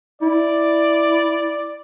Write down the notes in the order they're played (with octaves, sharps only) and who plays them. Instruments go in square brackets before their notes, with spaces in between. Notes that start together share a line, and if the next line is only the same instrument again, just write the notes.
[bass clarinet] E4 [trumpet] D5